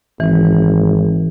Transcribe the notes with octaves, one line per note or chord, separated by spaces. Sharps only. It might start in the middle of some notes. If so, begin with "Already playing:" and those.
G#1 E3